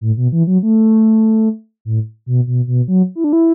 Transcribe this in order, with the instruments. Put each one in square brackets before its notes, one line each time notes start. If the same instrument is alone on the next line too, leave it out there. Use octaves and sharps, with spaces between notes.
[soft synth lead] A2
B2
E3
F#3
A3
A2
B2
B2
B2
F#3
E4
D4
E4